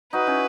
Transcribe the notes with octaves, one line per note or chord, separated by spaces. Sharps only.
D#4 F#4 B4
C#4 E4